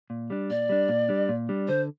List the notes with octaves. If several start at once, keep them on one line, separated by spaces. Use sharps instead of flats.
A#2
G3 D4
A#2 D5
G3 D4
A#2
G3 D4
A#2
G3 D4
D3 C5